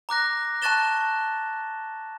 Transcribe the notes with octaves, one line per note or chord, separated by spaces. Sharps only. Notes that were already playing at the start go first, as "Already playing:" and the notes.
A#5 D6 F#6 A#6
A5 C#6 F#6 A6 E7 G7